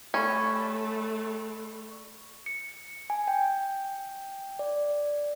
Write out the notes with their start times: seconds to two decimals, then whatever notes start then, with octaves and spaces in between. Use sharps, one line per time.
0.14 G3 A3 C#4 C#6
2.46 C#7
3.10 G#5
3.28 G5
4.59 D5